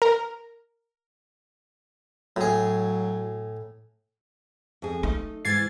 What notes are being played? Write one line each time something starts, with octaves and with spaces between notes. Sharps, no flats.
A#4
A2 F#3 G#4
F2 G#4
A3 D#4
G#2 E3 G#6 A6 C7